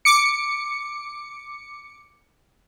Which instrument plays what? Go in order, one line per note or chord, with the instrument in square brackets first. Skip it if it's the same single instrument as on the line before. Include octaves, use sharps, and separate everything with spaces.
[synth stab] D6 C#7